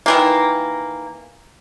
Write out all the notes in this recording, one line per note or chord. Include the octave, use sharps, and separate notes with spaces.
D#3 E3 A#3